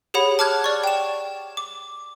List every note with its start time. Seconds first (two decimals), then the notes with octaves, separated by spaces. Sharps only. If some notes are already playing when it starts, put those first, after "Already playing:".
0.14 G4 G#4 C#5 F#5 B5
0.39 A5 D6 F6 F#6 G#6
0.64 D5 C#6
0.84 G5 E7
1.57 D6